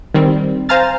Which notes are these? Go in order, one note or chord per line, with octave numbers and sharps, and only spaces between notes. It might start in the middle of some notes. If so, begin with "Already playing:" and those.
D#3 G3 C4
C5 F5 G#5 A#5 F6 A6